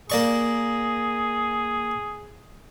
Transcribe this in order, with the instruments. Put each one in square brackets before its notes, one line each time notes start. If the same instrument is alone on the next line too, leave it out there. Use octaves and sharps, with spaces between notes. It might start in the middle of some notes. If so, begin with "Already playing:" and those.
[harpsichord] A#3 D5 C#6 [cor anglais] G#4